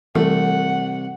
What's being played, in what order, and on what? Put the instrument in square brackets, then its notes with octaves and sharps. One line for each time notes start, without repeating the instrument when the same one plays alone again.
[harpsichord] C2 [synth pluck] E3 [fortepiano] A3 [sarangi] F#5